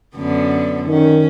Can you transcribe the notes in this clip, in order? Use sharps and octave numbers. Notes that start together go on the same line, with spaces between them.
F#2 D3 B3
D#3 C#4